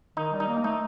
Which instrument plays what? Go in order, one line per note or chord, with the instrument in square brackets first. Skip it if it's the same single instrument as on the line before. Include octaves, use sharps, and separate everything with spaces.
[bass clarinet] D#3 [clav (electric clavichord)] D#4
[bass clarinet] G3
[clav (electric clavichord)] D#4
[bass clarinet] A#3
[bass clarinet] A3 [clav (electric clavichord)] D#4